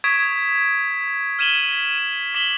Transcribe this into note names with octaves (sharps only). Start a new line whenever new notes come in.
C#6 D#6 G#6 B6 D7 E7
F6 G#6 D#7 E7 F#7 G7
B6
D#7
D6 B6 E7 F#7 G7